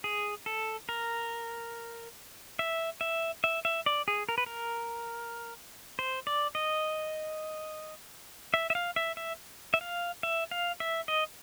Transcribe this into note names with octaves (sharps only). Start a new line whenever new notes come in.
G#4
A4
A#4
E5
E5
E5
E5
D5
G#4
A#4
B4
A#4
C5
D5
D#5
E5
E5
F5
E5
E5
E5
F5
E5
F5
E5
D#5